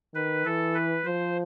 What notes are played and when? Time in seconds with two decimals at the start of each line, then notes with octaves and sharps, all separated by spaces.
0.14 D#3 B4
0.45 E3 A4
0.74 B4
1.05 F3 C5